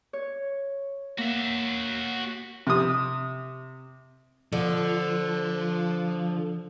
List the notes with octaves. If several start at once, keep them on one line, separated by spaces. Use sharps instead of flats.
C#5
A#3 F#4 E5
C3 D#6
D3 F3